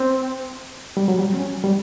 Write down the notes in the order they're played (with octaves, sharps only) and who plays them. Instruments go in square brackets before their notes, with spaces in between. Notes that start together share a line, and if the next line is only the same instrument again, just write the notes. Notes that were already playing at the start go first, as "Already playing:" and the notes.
Already playing: [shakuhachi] C4
[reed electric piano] G3
F#3
G3
[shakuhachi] C4
[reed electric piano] F#3 [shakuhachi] C#4
[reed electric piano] G3